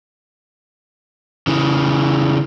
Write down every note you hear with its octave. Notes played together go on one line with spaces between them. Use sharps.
C#3 E3